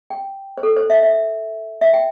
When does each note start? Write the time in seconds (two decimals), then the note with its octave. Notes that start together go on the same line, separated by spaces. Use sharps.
0.10 G5
0.58 C5
0.63 A4
0.77 C5
0.90 E5
1.03 E5
1.81 E5
1.94 G5